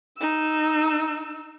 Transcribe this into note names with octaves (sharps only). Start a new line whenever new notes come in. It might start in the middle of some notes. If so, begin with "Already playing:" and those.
D#4 E6